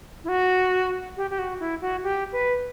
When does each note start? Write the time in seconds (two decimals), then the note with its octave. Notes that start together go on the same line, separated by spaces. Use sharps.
0.24 E4
0.29 F#4
1.17 G4
1.30 G4
1.39 F#4
1.60 E4
1.81 F#4
2.04 G4
2.32 B4